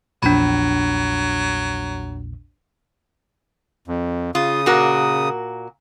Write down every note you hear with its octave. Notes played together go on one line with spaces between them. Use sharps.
A#1 E2 A#2 F#3 D4 B5
F2
C#3 F4 D#6
A#2 F#4 A#4